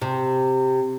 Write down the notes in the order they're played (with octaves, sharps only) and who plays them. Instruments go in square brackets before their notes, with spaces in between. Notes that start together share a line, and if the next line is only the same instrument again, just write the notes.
[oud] C3